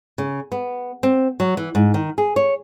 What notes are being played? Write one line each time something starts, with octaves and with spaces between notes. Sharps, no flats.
C#3
B3
C4
F#3
E3
G#2
D#3
G#4
C#5